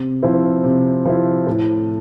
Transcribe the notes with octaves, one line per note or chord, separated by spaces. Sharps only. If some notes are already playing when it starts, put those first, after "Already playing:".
Already playing: C3
F3 C4 E4
C3
F3 C4 E4
A2